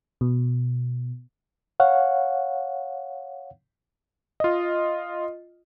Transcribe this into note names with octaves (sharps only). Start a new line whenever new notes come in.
B2
C#5 F5 F#5
F4 D#5